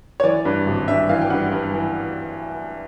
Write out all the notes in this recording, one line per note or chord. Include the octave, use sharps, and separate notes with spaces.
C#5
E3 D5
G2
G#1
G2 E5
E3 F5
G5
G2 F#5
G2
E3